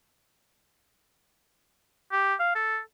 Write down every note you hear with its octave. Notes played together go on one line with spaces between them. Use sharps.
G4
F5
A4